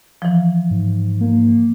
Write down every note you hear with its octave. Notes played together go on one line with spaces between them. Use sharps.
E3 F3
G#2
A#3